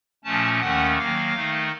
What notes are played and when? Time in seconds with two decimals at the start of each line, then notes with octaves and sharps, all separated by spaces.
0.24 A#2 F3 A3 C#4 A5
0.61 D#2 D#3 A3 C#4 F#5
0.97 D#3 F#3 A#3 F5
1.35 D#3 A3 D#4